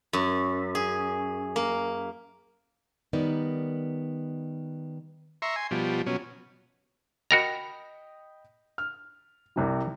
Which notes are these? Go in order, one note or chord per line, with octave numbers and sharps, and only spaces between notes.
F#2
G#4
A#3
D#3 G3 B3 D#4 A#4 D5
E5 A#5 C6 C#6
G#5 C6
B2 F3 G3
B2 F#3 C#4
F#4 A#4 D#5 G5 A#5 B5
F6
C2 C3 G3